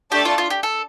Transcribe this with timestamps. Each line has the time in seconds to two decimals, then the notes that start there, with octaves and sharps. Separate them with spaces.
0.12 A3 D4 G4 A4 D5 A5
0.25 F4
0.38 F4
0.50 G4
0.63 A4